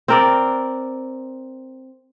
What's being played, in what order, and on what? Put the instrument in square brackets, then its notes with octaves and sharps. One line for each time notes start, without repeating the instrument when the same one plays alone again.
[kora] C4 A#4 D5